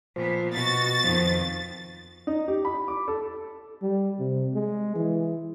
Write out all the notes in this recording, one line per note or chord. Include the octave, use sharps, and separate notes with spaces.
A#2 F3 B3
B2 F#4 A6
F2 D#3 F3
D#4
G4
B5
D6
A4
G3
C3
G#3
E3